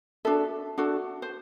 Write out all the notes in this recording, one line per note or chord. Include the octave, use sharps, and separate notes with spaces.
D4 F#4 A4 E5
D4 F#4 A4
C5